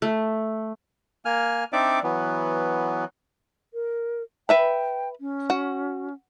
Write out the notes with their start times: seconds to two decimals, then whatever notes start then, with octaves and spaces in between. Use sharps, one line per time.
0.02 A3
1.25 A#3 G#5 F6
1.73 C4 D4 D#4 D5 E5 D6
2.03 E3 F#3 B3
3.74 A#4
4.49 B4 E5 G5 B5
5.21 C#4
5.50 F#4